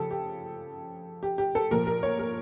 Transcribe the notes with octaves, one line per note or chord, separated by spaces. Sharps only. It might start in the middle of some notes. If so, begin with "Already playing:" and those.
Already playing: C#3 F3 G4 A4
G4
G4
G4
A4
A#2 F3 A#4
A#4
C#5
A#4